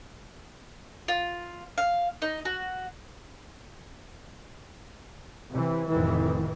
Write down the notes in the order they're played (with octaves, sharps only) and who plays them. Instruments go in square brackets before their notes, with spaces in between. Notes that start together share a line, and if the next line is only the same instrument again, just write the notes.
[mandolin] F4
F5
D#4
F#4
[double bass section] C3 E3
F1 F2 A2 D#3 E3